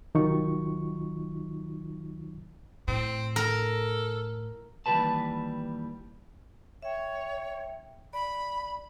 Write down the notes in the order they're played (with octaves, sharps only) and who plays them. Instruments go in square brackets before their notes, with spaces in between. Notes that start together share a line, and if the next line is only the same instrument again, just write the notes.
[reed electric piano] C2 D#3 F#3 D#4 F4 C#6
[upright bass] A2 [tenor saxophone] C4
[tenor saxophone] A4 [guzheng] A#4
[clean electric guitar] D#2 E3 F#3 G3 B4 A5
[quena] C#5 [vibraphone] E5 G5
[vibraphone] D5 [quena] B5